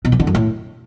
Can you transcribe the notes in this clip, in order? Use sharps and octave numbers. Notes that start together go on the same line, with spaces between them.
B2
E3
D3
F#2
A2